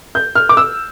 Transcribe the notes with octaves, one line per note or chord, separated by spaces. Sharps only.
G6
F6
D6
E6